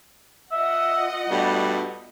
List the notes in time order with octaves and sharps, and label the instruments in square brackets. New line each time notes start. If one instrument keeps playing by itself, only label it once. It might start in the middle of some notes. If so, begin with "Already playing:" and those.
[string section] F4 D#5 F#5 [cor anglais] E5
[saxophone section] G2 B2 A3 [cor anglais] G3